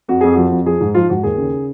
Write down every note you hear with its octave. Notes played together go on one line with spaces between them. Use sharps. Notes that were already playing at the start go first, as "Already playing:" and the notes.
F2 F#4
F2 G#4
F3 F#4
F2
F3 G#4
G#2
F3 F4
G#2 F#4
D#2 G#4
C#3